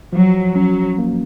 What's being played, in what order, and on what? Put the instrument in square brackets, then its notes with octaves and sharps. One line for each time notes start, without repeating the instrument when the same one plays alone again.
[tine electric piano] F3 [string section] F#3
[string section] F#3 [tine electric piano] C#4
[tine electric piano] A#3